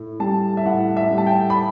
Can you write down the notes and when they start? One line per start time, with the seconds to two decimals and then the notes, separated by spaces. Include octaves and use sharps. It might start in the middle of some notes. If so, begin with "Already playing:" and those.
Already playing: A2
0.20 G3 A5
0.57 E5
0.65 A2 F#5
0.97 E5
1.11 G3
1.18 A5
1.27 G5
1.50 B5